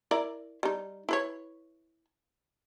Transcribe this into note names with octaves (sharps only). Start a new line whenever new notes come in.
E4 A#4 D5
G3 D#4
E4 B4 C#5